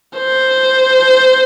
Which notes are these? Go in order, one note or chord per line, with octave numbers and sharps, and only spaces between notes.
C5